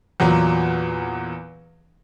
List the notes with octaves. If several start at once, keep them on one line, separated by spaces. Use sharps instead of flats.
E2 A#2 F#3